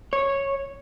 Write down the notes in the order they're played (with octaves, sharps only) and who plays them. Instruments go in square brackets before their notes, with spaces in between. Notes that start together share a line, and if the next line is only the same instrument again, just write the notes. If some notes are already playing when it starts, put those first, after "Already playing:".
[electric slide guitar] C#5